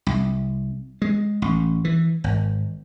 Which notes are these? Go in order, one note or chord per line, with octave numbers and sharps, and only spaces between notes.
C2
G#3
A1
E3
G#1